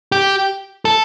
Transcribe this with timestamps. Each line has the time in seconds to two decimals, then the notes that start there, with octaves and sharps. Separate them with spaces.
0.12 G4
0.85 A4